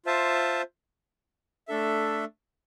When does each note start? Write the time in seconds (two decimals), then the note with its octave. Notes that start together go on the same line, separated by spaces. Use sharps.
0.05 F4 C5 E5 A5
1.68 A3 D4 A4 E5